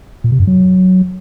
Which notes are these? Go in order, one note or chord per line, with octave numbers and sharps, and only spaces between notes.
A#2
C3
F#2
F#3